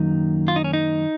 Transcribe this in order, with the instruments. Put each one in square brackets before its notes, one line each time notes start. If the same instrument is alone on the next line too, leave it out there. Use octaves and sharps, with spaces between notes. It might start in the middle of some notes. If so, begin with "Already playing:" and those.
Already playing: [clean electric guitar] F#2 D#3 F#3 A#3 D#4
F4
D#4
C#4
D#4